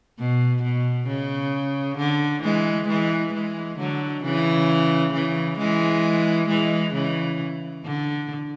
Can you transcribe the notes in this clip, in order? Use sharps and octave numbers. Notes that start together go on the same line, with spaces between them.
B2
B2
C#3
D3
E3 G#3
E3 G#3
E3 G#3
D3 F#3
C#3 E3
C#3 E3
E3 G#3
E3 G#3
C#3 E3
D3